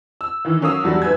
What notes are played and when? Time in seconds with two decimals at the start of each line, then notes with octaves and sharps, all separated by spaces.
0.21 E6
0.45 D#3 E3
0.61 F#3 C#4 A#4 F5 D#6 E6
0.84 E2 D3 F#3 G3 D4
1.02 F#1 G#2 B4 G#5 E6 G#6